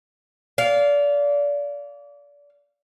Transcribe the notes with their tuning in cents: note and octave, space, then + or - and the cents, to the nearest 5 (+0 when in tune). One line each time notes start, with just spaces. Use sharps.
D5 -30 F5 +0